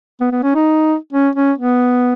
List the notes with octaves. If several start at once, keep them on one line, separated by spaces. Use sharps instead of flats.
B3
B3
C#4
D#4
C#4
C#4
B3